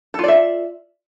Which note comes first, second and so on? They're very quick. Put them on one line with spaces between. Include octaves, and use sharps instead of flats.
A4 F4 D5 E5